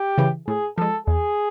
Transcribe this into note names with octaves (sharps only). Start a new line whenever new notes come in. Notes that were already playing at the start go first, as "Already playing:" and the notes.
Already playing: G4
C#3 E3
A2 G#4
F3 G#3 A4
E2 G#4